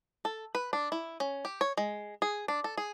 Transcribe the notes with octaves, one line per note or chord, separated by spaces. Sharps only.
A4
B4
D4
E4
C#4
G4
C#5
G#3
G#4
D4
A4
G#4